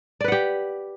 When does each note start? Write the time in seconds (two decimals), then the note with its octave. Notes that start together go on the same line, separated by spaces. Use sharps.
0.21 D5
0.24 B4
0.28 F#5
0.32 G4